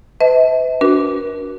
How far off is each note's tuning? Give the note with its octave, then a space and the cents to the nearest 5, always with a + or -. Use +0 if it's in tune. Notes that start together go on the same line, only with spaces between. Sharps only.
B4 +45 E5 -45 A5 +0
D4 -20 F#4 +0 A#4 +35